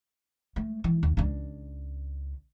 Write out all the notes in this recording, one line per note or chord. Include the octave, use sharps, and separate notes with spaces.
A3
E3
D#2
C#2 D4